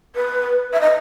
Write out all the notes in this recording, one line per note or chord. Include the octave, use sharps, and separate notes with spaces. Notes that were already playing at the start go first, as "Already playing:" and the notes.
B4
E5
D#5